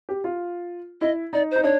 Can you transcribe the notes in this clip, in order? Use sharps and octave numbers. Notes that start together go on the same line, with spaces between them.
G4
F4
E4 D#5
D#4 D5
D#4 C5
D4 C#5